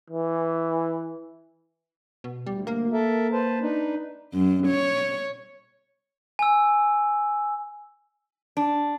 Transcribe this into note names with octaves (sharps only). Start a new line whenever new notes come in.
E3
B2
D2 G3
A#3
A4 A#4 E5
B4 C5 A5
D4 D#4 B4
F#2
C#5
G#5 E6
D4